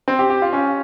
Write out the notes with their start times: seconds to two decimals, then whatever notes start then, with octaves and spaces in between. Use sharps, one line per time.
0.08 C4
0.19 G4
0.30 G4
0.42 F4
0.53 C#4